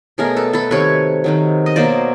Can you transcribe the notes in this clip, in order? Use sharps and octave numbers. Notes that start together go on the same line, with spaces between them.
B2 F#3 A3 G#4 A#4
A4 B4
A4 B4
C3 D#3 F#3 B4 C#5
C3 D#3 F#3
D#5
B2 F#3 A#3 C5 D5